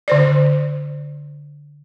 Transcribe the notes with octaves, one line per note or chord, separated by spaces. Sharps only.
D3 C5 D5